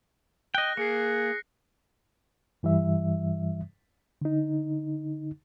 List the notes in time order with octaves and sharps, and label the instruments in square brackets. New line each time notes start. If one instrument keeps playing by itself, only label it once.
[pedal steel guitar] D#5 G5 [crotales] F#6 A#6
[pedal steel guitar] A#3 [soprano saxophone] G#4 [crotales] C7 C#7
[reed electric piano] G2 E3 G3 E5
D3 D#4